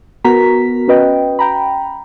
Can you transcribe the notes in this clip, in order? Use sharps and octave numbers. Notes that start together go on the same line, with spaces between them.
B3 F#4 A#4 A#5 B6
C#4 F#4 B4 D#5 G5
G5 A#5 B5